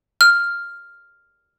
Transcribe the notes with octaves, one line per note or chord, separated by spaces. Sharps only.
F6